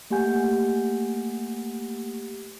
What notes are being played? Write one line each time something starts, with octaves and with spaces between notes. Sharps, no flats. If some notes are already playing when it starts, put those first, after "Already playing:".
A3 A#3 G4 F#5 G#5 G6